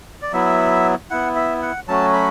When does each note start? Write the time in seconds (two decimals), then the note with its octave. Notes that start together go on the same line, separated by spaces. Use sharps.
0.22 D5
0.32 F#3 B3 E4 E5
1.10 B3 E4 F#5
1.36 E5
1.62 F#5
1.88 F#3 A3 C#4 F#4 A5
2.13 B5